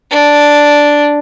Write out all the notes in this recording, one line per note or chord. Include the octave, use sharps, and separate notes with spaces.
D4